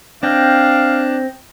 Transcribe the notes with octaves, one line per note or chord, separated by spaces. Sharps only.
C4 D4 D#5 F5 G5